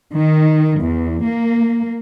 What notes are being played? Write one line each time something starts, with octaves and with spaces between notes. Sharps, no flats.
D#3
E2
A#3